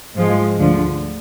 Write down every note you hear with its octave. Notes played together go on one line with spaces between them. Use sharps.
G#2 F3 G#3
D2 D3 F3